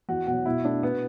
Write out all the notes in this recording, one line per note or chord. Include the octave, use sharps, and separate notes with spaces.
E2 F#4
B2 F#3 F#4
B2 E4
A3 D4
B2 B3